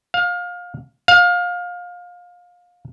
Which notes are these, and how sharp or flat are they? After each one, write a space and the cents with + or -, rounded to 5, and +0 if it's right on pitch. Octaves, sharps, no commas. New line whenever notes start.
F5 +25
F5 +25